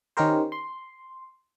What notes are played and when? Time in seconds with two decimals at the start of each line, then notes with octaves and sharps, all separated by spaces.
0.17 D#3 C#4 D#4 G4 A#4 C5
0.52 C6